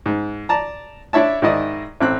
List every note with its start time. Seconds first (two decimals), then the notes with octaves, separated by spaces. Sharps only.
0.06 G#2
0.49 D5 A5 A#5
1.13 D4 E4 C#5 E5 A5
1.42 G#2 D#3 E4 D5 D#5
2.01 A1 C4 F#6